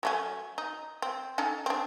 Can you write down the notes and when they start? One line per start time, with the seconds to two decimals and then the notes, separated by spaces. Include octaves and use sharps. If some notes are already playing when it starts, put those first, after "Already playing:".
0.03 F#3 A3 C#4
0.58 D#4
1.02 C4
1.38 C#4 D#4 A4
1.66 C4 D4